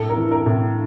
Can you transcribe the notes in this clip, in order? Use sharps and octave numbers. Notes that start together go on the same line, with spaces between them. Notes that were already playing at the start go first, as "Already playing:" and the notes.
Already playing: A2 A4
A#4
E3
A#4
A2